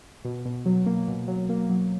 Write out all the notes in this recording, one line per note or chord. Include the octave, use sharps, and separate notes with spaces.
B2
B2
F#3
A#3
B2
F#3
A#3
F#3